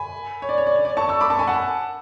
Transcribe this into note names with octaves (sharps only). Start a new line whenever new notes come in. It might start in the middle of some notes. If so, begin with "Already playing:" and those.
Already playing: G#5 B5
C#5
D5
C#5
D5
C#5
D5
A5 C#6
C#6 E6
B5 D6
A5 C#6
G#5 B5
F#5 A5